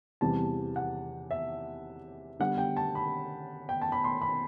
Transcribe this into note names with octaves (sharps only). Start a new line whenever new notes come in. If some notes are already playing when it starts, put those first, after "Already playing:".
E2 C3 E3 G3 A5
F#5
E5
D3 G3 B3 F#5
G5
A5
B5
G5
A5
B5
C6
B5